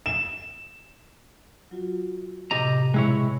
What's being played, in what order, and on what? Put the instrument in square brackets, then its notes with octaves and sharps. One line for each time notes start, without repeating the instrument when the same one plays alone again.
[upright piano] E7
[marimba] F#3 F4 F#4
[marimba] A2 C3 E6 [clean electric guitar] G4 D#5 A#5
[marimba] B2 G5 G#6 [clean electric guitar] G#3 E4 C#5